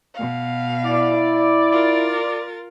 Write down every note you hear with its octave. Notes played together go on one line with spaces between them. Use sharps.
B2 F5
E4 D5
F4 A#4 A6